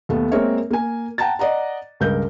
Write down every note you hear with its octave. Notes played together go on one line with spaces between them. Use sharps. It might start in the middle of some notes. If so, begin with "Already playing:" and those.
D#2 A3 B3
G#3 A#3 C4 A#4 C#5 E5
A#3 G#5
F#5 G5 A5 A#5 A6
D5 D#5 F#5 A#5
C#2 G2 A#4 G6